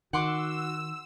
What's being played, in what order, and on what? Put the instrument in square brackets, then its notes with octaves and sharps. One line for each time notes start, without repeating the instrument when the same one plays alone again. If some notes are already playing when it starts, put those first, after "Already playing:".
[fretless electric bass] D#3 [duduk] F#4 [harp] F#5 C6 D6 [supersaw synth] E6